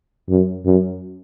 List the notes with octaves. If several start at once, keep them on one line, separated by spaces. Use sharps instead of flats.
F#2
F#2